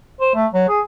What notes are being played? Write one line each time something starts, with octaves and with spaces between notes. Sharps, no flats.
C5
A3
F#3
G#4